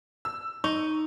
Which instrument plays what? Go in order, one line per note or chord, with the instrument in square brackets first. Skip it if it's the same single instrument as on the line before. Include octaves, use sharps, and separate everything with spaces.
[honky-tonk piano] E6
[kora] D#4 [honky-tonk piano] C#6